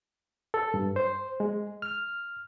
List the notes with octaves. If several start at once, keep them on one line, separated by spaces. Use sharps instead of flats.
A4
G2
C5
G#3
F6